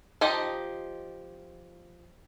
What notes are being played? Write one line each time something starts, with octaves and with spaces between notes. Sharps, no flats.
F3 D#4 G4 D#5